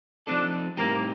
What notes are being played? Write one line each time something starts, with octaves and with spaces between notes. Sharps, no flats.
F3 C4 D4 D#4 A4
A2 G3 A#3 C4 D#4 G4